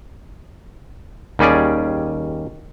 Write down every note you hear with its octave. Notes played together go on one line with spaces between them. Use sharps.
D#2 G3 C#4 G#4 D5